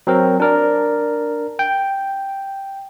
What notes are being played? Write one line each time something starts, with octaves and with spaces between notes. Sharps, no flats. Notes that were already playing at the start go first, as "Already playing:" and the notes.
F#3 C4 A#4
D4 A#4 D5
G5